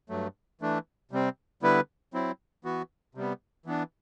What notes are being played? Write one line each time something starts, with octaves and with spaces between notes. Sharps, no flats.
G2 F#3 A3
E3 A3 D4
C3 G3 C4
D3 G3 B3 E4 B4
F#3 C4 E4
E3 B3 F#4
C3 G3 B3
E3 B3 D4